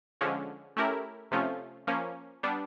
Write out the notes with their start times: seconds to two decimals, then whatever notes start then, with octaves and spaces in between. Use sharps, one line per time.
0.21 D3 F3 G#3 C#4
0.77 A3 C#4 E4 G4 A#4
1.31 C3 F3 A3 C#4 F4
1.87 F3 A#3 C#4
2.43 G3 B3 D4